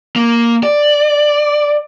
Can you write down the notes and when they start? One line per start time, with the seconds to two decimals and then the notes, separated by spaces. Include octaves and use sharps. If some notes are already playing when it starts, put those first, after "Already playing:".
0.16 A#3
0.63 D5